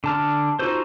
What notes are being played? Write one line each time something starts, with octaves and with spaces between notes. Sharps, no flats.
D3 A5 F6
D#4 F4 F#4 A4 C5